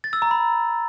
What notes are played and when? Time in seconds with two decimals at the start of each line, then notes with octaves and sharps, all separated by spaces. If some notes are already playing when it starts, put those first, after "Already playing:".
0.04 A6
0.13 E6
0.22 A#5
0.31 B5